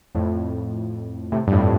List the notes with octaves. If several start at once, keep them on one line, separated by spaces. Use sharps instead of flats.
F2 A2
A2 C3
G2
F2 A2